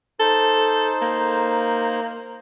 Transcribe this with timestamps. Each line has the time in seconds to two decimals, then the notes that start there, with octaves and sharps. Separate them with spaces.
0.20 D#4 A4 C5
1.02 A#3